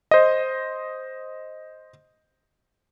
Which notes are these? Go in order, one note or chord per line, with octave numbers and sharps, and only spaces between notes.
C5 D#5